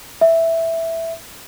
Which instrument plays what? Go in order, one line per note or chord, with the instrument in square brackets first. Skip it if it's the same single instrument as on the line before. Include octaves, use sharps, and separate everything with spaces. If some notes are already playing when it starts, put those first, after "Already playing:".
[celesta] E5